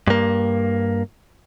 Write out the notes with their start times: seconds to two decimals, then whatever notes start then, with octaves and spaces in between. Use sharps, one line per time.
0.07 G2 A#3